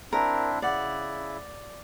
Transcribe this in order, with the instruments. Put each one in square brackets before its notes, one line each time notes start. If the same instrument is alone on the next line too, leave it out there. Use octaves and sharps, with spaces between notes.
[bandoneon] C4 D4 E4 [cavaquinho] A#4
[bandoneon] C#3 E4 [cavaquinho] D5 F#5